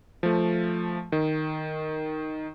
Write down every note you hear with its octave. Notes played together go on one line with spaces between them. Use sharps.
F3 A3
D#3